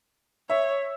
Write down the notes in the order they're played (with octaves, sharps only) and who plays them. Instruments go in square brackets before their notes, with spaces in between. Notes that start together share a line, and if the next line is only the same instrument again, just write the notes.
[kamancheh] C#5 [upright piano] E5